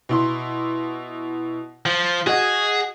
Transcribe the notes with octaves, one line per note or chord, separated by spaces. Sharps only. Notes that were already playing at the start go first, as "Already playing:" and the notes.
B2 E4 C6
F3
F#4 G#4 D#5